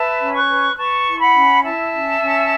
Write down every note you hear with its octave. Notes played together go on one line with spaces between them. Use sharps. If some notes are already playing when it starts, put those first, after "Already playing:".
Already playing: B4 E5 A5
C#4
C#6 F#6
B4
B4 A5 C#6
E4
F#5 B5
C#4
E4 E5 A5
C#4
C#4